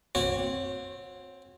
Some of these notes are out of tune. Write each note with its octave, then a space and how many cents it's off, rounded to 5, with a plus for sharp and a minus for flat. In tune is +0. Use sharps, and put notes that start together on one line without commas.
C4 +0 F#4 -30 C#5 -20